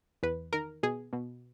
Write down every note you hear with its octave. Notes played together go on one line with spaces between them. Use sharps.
E2 B4
D#3 A#4
B2 G#4
B2